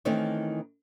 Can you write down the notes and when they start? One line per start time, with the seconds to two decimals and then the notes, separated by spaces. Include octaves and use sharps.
0.05 D#3 E3 A3 C4 C#4 D#4